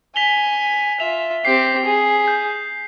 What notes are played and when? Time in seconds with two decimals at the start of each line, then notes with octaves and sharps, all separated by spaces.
0.16 G#5 B6 F7 G7
1.00 F4 E5 F7
1.45 C4 G4 C7
1.85 G#4
2.28 G6